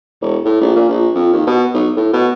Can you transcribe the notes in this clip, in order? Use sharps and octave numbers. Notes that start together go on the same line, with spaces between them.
E1
A2
A#1
A#2
A#1
F2
D#2
B2
B1
A2
B2